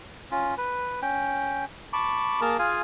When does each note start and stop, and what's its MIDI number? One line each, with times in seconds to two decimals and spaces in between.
0.31 0.55 61
0.31 0.55 65
0.57 1.00 71
1.02 1.65 61
1.02 1.65 79
1.93 2.41 81
1.93 2.41 83
1.93 2.41 85
1.93 2.41 86
2.41 2.57 58
2.41 2.57 68
2.41 2.57 70
2.41 2.57 81
2.59 2.82 65
2.59 2.82 68
2.59 2.82 77
2.59 2.82 80